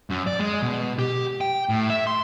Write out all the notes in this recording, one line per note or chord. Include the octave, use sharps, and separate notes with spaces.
F#2
D5
G#3
B2
G4
G5
A2
E5
C6